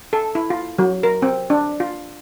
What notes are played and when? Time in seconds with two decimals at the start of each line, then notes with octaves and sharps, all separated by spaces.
0.13 A4
0.35 E4
0.50 F4
0.79 F#3
1.03 A#4
1.22 C4
1.50 D4
1.80 F4